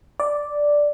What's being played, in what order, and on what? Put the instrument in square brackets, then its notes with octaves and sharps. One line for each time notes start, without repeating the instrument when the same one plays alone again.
[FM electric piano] D5